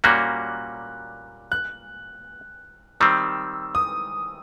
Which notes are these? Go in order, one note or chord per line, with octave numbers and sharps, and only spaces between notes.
A#2 G3 A#3 C#4 F#4 F#6
F#6
D#3 G3 C4 E6
D#6